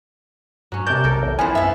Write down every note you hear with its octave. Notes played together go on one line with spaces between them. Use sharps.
G2 F#3 C#4
C3 D4 A#4 D5 G6
B1 A4 A#4
E2
E3 F3 B3 C4 C5 G#5
F#2 B3 E5 F5